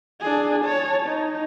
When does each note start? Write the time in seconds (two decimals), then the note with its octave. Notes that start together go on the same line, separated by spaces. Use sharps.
0.21 D4 G#4
0.64 C#5 A5
1.06 D#4